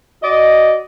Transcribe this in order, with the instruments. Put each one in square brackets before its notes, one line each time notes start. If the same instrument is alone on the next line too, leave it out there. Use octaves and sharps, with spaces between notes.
[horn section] F#4 D5 D#5